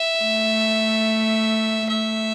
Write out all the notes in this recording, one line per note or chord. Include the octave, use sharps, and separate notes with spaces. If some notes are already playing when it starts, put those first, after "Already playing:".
Already playing: E5
A3
A3 E5